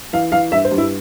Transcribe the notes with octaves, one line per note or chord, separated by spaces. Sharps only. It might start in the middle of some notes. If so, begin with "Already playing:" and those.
E3 F5
E3 F5
G2 E5
C5
G2
E4